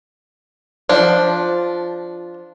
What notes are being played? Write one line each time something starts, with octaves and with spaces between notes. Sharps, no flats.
F3 D4